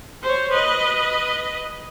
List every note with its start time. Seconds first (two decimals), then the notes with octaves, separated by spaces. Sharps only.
0.23 C5 C#5
0.52 B4 D#5